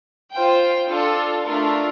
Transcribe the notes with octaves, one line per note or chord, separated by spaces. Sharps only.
F4 C5 G5
D4 F4 A4
A3 D4 F4 A#4